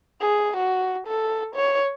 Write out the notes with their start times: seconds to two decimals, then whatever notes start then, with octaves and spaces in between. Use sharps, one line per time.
0.21 G#4
0.57 F#4
1.07 A4
1.55 C#5